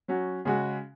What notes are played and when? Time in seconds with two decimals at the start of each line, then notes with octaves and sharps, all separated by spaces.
0.08 F#3 C#4 F#4
0.45 C#3 G#3 F#4